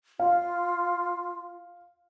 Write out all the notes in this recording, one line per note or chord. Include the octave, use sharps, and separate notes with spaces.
F4 F5